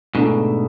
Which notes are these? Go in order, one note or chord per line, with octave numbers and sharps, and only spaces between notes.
G#2 B2 D3 A3 D4 A4